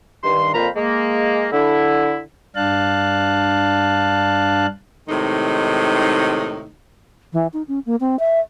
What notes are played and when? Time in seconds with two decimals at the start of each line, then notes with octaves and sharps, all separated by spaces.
0.24 G2 D#3 C6
0.54 F2 A#2 F4 C5 A#5 B5
0.76 G#3 A#3
1.53 D3 E4
2.56 G2 D4 F5 A5 F#6
5.08 A2 C3 D#3 G#3 D#4
7.33 E3
7.53 D#4
7.68 C#4
7.86 A#3
8.00 C4
8.19 E5